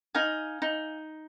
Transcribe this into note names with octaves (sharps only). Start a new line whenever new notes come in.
D#4 F5 G#5
D#4